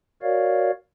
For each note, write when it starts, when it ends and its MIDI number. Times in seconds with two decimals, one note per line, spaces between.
0.22 0.71 66
0.22 0.71 70
0.22 0.71 73
0.22 0.71 74
0.22 0.71 77